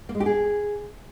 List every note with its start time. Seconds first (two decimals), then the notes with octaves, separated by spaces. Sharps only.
0.09 A#3
0.15 G#3
0.20 G4
0.26 G#4